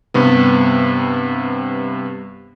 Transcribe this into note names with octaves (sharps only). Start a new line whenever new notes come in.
G2 C3 B3